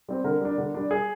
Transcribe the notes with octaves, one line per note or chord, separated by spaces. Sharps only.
G3 C4
D3 A#4
G3 D4
D3
G3 D4
G#4